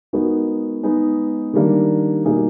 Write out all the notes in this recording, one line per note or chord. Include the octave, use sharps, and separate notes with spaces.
G#3 B3 D#4 F#4 A#4
G#3 B3 D#4
D#3 G3 A#3 D4
B2 G3 A#3 D#4 G#4